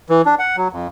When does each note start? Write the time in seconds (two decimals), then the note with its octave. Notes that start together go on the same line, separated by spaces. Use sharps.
0.10 E3
0.26 D4
0.39 F#5
0.57 F#3
0.73 F2